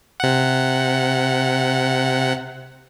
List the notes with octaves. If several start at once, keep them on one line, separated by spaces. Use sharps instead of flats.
C3 F#5